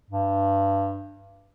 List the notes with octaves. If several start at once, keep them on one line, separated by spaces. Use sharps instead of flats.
G2